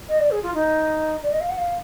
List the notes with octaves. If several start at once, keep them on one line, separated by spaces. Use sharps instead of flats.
D#5
D5
G#4
F4
D#4
D5
D#5
F5
F#5
F5